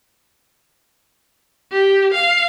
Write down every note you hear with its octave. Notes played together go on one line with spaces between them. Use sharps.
G4
F5